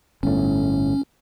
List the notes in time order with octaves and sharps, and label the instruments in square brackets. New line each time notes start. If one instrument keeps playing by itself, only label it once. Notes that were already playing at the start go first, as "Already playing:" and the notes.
[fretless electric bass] G1 A2 [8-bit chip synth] C#4